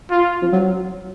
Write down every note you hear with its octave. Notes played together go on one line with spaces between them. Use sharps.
F4
F3
F#3